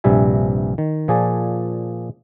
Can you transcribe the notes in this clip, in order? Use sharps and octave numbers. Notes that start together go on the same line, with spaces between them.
A#1 G2 C3 G3 E5 G#5
D#3
A#2 F3 G#4 D5 G#5 A5